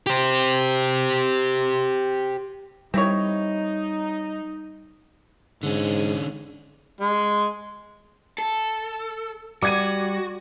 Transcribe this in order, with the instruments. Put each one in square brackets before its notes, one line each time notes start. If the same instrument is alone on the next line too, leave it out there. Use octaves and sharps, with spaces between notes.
[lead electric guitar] G4 C5
[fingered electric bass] G3 [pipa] C4 E4 C#5 [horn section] D#4
[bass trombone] G#2 [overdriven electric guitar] D3 C#4
[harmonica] G#3
[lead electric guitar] A4
[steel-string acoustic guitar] G3 [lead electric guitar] F#4 [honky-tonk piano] D6 G#6 D#7